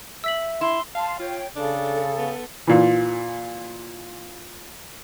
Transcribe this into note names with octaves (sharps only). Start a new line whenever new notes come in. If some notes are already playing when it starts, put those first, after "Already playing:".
E5 E6 B6 F#7
E4 C6
F5 A5 C6
F4 C#5 G5
C#3 D4 A4
B3
A#2 E3